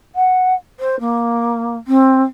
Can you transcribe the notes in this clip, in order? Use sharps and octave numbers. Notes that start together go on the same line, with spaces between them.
F#5
C5
A#3
C4